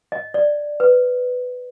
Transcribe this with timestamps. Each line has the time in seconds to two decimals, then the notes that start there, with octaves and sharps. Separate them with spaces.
0.12 D#5
0.34 D5
0.80 B4